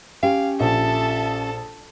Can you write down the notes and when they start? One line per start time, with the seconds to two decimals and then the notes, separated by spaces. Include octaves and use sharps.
0.23 C#4 G4 F5 G5
0.60 A#1 A4 E5 A5